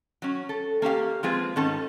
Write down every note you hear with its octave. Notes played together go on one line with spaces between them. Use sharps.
F#3 C#4
A4
A#3 C#4 G4 F5
F3 G#3 C4 F4 G#4 B4
G#2 D#3 C#4 A4 A5